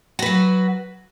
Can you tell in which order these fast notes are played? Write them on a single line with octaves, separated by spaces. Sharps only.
F#4 B4 F#3